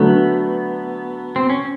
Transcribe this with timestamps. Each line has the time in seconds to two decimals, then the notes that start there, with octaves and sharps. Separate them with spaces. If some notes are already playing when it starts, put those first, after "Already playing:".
Already playing: D3 F#3 A3 B3
1.36 C4
1.50 C#4